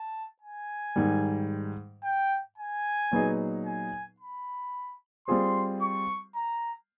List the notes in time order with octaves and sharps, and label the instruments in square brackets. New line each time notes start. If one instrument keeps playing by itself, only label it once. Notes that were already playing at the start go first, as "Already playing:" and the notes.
Already playing: [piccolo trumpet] A5
G#5
[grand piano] G#2 D#3 G3
[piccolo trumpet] G5
G#5
[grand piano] A#2 F#3 B3 D#4 G#4
[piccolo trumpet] G#5
B5
[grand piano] G3 C4 F4 G#4 C5 [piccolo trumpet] C6
[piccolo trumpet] C#6
A#5